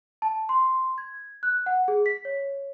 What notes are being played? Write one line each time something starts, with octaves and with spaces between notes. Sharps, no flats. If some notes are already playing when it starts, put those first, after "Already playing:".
A5
C6
G#6
F#6
F#5
G#4
B6
C#5